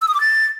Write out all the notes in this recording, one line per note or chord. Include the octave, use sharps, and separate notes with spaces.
E6
D#6
D6
A6